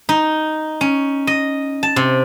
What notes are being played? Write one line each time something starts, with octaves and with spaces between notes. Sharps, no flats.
D#4
C#4
D#5
A5
C3